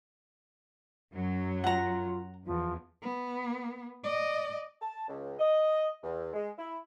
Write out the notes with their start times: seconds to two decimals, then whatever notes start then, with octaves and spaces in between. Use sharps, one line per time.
1.12 F#2 F#3
1.64 F4 F#5 A#5
2.45 E2 F3
3.02 B3
4.04 D5 D#5
4.81 A5
5.08 C#2
5.40 D#5
6.03 E2
6.33 G#3
6.58 E4